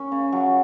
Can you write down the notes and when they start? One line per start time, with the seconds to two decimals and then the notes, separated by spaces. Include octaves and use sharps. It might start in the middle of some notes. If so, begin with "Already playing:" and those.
Already playing: C#4
0.12 C#3
0.32 F#3